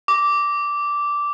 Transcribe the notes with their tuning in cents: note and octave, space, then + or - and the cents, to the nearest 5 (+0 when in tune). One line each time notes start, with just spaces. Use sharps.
D6 -10